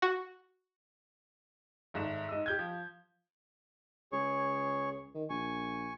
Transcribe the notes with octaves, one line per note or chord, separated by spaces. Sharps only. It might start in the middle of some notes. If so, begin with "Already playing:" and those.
F#4
G#1 G#2 A4 E5 E7
G#2 D#5 E6
G4 G6 G#6
F3
C#2 G#4 C#5 C#6
D#3
A#1 G#5 C#6